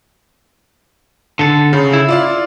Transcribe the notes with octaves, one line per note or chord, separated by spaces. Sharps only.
D3 A4
C#3
E4
F4 D5 F5